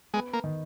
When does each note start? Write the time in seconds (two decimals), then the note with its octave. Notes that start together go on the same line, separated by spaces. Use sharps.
0.14 G#3 B3
0.33 A#3
0.44 D#3